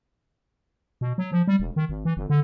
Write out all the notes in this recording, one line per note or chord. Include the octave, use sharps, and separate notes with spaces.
B2
F#3
F3
G3
E1
D#3
G#1
E3
G1
D3